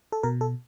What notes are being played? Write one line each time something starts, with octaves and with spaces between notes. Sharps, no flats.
A4
B2 A#4
A4